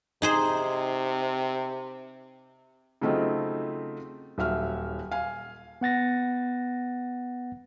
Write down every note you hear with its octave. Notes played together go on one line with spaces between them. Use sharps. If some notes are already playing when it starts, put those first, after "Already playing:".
C3 D#4 G#4 C5
C#3 F#3 A3 C4 D#4 F4
D#1 F#3 E5 F6
F5 G#5
B3 F#5 A6 A#6